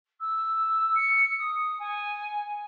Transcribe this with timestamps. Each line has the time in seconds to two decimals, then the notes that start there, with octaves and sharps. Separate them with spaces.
0.20 E6
0.95 C#7
1.38 D#6
1.79 G#5